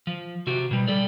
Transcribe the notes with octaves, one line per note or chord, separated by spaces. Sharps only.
F3
C3 F#4 G4
B2 G3
G3 A4 D5